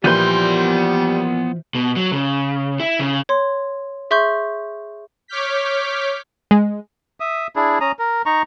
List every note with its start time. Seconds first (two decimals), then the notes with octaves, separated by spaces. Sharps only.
0.04 A#2 E3 F3 G3 B3 B4 C6 G6
1.75 B2
1.96 F#3
2.12 C#3
2.80 E4
2.99 C#3
3.29 C#5 C6
4.11 G#4 E5 C6 C#6 G6
5.28 C#5 D6 F6 G6 B6
6.51 G#3
7.20 E5 D#6
7.56 D4 E4 G#4
7.81 C#4 A#5 D#6
7.99 A#4
8.26 D#4 A#5 C#6